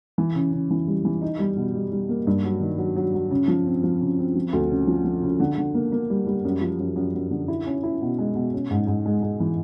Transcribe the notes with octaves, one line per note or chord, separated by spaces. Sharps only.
E3
C#3
C#3
E3
G3
E3
D#4
G3
B2
G3
G3
A#3
G2
F#3
D#3
F#3
F#3
F#3
C#3
F3
C4
F3
C#3
C4
F3
D2
C#3
F3
F3
C#3
D3
D3
A#3
A#3
G3
G3
F#2
F3
F#2
F#2
F#2
D3
E4
C#4
E4
B2
G#3
B2
C#4
G#2
G#2
G#3
G#3
E3